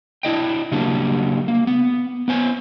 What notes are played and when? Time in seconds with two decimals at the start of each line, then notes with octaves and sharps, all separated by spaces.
0.23 D4 E4 D#5 G5
0.72 C#3 F#3 G3 A#3 D4
1.48 A#3
1.67 B3
2.28 B3 C5 G#5